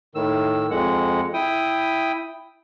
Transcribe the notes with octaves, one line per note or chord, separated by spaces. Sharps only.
A2 D#3 E6
F2 G#3 F#5
E4 G5 D#6